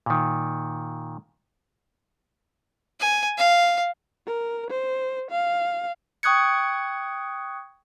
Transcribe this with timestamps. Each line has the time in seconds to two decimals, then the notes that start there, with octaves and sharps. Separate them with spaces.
0.06 A#2 D#3
3.00 G#5
3.38 F5
4.27 A#4
4.70 C5
5.31 F5
6.23 G5 C#6 D#6 F#6 G#6 C#7